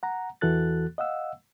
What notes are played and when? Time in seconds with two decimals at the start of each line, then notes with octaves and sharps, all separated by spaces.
0.03 F#5 A#5
0.41 E2 E3 F#4 A4 F#6 A6
0.98 D#5 F5 F#5 E6